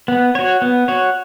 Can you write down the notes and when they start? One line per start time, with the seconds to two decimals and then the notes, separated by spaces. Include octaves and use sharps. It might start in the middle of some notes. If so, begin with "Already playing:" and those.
0.08 B3
0.35 F#4 C#5
0.62 B3
0.88 F#4 C#5